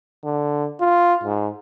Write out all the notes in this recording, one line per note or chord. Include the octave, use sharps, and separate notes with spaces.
D3
F4
G#2